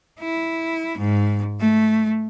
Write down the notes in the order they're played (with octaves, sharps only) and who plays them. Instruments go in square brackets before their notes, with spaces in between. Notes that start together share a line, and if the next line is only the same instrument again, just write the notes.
[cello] E4
G#2
A3